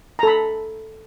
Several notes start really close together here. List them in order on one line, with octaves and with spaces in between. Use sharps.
A#5 A4 B5